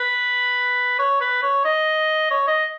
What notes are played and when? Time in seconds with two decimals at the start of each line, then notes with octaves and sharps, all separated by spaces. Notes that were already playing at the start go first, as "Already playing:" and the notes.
Already playing: B4
0.99 C#5
1.21 B4
1.42 C#5
1.65 D#5
2.31 C#5
2.47 D#5